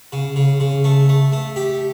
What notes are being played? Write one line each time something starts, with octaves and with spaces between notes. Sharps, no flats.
C#3
C#3
C#3
A3
A3
A3
G4